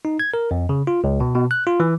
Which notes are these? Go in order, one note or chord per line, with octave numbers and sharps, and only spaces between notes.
D#4
G#6
A#4
F2
C#3
F4
C#2
B2
B2
F#6
F4
E3